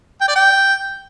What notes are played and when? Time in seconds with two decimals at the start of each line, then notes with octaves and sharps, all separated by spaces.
0.21 G5
0.28 D5
0.36 G5